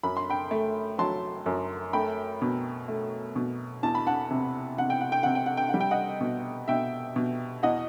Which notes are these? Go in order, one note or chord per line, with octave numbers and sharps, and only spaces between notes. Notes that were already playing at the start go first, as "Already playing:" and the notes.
F#2 B5
C6
G5 B5
A3
F#3 A5 C6
F#2
A3 G5 B5
B2
A3
B2
E2 A5
B5
F#5 A5
C3
C3 F#5
G5
F#5
G5
C3 F#5
G5
F#5
G5
G3 F#5
G5
D#5 F#5
B2
B2 E5 G5
B2
E2 D#5 F#5